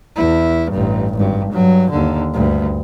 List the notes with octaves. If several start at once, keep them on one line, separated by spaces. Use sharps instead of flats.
E2 E4
A1 G2
G#1 G2
G2 F#3
D#2 D3
D2 G2